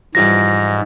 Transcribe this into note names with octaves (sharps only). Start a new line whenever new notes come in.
G#2 E3 F3 G3 A#6